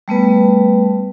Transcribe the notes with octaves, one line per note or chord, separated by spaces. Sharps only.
G3 A3 B3 B4